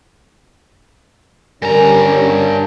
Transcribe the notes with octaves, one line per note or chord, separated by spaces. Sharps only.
G2 D3 G3 C#4 A#4 G#5 A#5 A#6